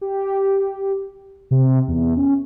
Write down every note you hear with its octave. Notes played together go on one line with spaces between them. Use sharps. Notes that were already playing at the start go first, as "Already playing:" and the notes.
G4
C3
E2
C#4